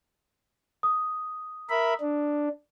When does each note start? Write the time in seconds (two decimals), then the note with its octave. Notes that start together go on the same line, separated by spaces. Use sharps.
0.83 D#6
1.70 A#4 E5 B5
2.01 D4